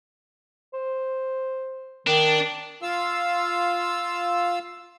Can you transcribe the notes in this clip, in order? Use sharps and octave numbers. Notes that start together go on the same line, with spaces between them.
C5
D#3 D4
F4 F5 E6